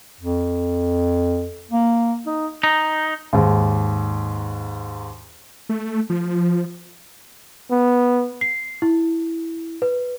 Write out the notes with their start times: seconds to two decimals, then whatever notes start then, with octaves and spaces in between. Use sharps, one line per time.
0.21 F2
1.72 A#3
2.26 D#4
2.63 D#4
3.33 D#2 G#2
5.69 A3
6.10 F3
7.71 B3
8.41 C7
8.82 E4
9.82 B4